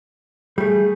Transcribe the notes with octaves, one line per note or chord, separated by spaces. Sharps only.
G3 A3 G#4